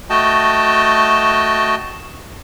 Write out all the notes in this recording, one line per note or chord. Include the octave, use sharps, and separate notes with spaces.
A3 F#4 D#5 G5 A5